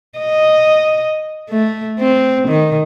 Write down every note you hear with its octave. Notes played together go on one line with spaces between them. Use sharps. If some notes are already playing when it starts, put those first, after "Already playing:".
D#5
A3
C4
D#3